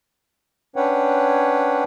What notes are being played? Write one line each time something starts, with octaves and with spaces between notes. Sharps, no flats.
C#4 D4 B4 C#5 F#5 G5